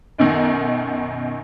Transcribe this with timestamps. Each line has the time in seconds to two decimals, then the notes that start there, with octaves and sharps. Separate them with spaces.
0.18 B1 F#2 B2 D#3